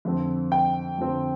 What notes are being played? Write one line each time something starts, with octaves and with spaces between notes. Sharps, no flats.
F2 D3 F3 C4
G5
F2 D3 F3 C4